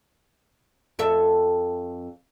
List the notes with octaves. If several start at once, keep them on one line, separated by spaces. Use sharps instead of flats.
F2 A4 E5